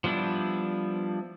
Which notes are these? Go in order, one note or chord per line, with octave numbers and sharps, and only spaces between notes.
F3 G3 B3 D4 E4